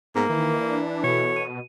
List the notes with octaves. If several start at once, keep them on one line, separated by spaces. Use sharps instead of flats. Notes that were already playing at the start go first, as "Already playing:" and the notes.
G#2 A#3 B3 A#5
D#3 E3
D4
B2 F#4 A4 C#5
D#7